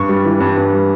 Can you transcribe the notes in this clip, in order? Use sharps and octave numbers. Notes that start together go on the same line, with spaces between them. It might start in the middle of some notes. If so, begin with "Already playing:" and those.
Already playing: G2 C#6
G3
E3
G2
G2
G3